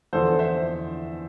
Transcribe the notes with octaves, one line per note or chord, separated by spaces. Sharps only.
E2 D3 F3 A4 C5
C5 E5